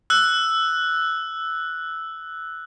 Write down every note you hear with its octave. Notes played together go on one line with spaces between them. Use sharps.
E6 F#6